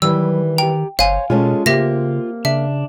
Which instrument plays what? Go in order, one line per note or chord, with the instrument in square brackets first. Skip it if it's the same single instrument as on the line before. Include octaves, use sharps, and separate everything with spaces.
[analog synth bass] D#3 [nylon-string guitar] E3 G3 [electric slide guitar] F#3 [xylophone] E6
[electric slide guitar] G4 A#5 [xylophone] G5
[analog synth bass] G1 [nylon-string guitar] C5 [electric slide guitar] C#5 [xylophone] F5 G#5
[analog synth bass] B2 [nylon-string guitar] G#3 C#4 A4 [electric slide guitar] F4
[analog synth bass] C#3 [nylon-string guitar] A#3 C4 [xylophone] G4 E5 A#6
[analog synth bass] C#3 [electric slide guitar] D4 [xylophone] E5